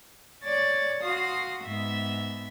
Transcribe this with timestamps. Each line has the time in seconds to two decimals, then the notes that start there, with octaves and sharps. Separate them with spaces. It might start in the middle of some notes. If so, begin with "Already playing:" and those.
0.44 C#5 D5 A6
1.02 F#4 F5 C6 D#6
1.65 G#2 B3 E5